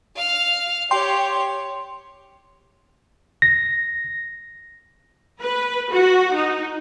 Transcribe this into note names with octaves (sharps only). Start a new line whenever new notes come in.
F5 F6
G4 C#5 G5 C6
A#6
B4
F#4
D#4